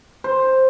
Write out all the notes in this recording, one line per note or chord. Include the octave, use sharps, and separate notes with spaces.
C5